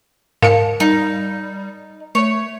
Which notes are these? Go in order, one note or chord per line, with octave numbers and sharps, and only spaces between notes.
G#2 A#4 F5 A5 C#7
G3 D#4
A3 C#5